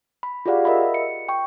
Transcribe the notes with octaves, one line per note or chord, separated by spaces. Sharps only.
B5
F4 G4 G#4 D5 F5 F#5
A#4 D#5 E5 B5
C#7
G5 C#6